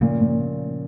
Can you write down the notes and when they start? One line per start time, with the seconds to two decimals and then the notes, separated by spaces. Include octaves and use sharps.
0.01 A#2 C#3 F3
0.21 A#2